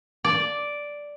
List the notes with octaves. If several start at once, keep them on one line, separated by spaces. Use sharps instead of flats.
D5